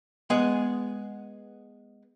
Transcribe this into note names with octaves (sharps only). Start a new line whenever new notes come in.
G#3 B3 G#4 D#5